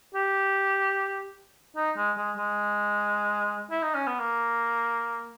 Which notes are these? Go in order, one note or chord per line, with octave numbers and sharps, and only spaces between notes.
G4
D#4
G#3
G#3
G#3
E4
D#4
C#4
B3
A#3